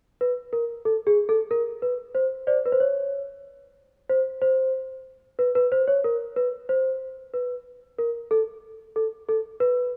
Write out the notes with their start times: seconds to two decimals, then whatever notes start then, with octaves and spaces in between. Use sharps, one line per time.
0.21 B4
0.53 A#4
0.85 A4
1.07 G#4
1.29 A4
1.51 A#4
1.82 B4
2.15 C5
2.47 C5 D5
2.66 B4
2.72 C5
2.80 C#5
4.10 C5
4.42 C5
5.39 B4
5.55 B4
5.72 C5
5.88 C#5
6.04 A#4
6.36 B4
6.69 C5
7.34 B4
7.98 A#4
8.31 A4
8.96 A4
9.29 A4
9.60 B4